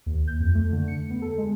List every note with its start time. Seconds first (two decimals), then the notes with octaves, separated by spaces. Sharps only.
0.06 D#2
0.27 G6
0.40 F2
0.55 A3
0.72 D3
0.88 C#7
1.10 B3
1.22 A4
1.38 G#3